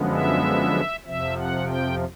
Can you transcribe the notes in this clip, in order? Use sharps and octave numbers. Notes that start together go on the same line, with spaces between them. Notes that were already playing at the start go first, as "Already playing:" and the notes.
Already playing: F#2 D3 F3 G#3 B3
E5
F2 C3 F3 E5
F#5
G5